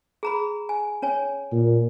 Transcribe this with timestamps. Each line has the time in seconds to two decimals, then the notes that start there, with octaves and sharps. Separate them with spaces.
0.23 G#4 A#5 B5
0.69 G#5
1.02 C#4 C#5 G#5
1.52 A#2